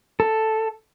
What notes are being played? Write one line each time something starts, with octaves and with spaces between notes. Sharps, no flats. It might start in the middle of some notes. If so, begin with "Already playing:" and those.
A4